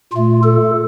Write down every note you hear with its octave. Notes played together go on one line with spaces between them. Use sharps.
A#2 A3 F4
A4